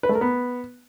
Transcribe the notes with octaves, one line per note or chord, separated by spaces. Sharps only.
B4
A3
A#4
B3